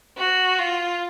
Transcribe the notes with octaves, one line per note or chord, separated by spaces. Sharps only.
F#4
F4